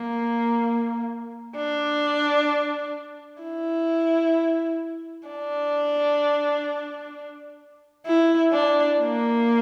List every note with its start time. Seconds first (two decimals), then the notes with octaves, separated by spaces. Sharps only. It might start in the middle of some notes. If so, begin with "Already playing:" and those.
Already playing: A#3
1.56 D4
3.42 E4
5.28 D4
8.07 E4
8.52 D4
8.98 A#3